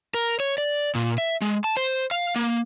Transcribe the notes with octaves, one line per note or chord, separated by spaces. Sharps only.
A#4
C#5
D5
A#2
E5
G#3
A5
C5
F5
A#3